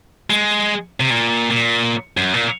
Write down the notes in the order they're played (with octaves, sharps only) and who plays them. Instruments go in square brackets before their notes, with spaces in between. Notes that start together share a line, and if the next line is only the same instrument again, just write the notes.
[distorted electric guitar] G#3
C3
A#2
A#2
F#2
A#2